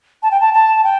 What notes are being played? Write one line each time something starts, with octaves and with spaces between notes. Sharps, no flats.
A5
G5
A5
A5
G5